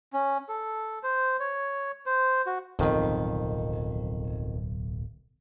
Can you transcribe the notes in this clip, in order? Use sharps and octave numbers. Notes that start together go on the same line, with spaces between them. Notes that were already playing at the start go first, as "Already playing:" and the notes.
C#4
A4
C5
C#5
C5
F#4
D1 B1 F2 D#3